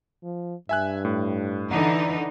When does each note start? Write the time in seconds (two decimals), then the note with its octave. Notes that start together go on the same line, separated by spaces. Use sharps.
0.23 F3
0.69 G2 E5 G#5 F#6
1.05 A2
1.71 D3 E3 D#4 F#5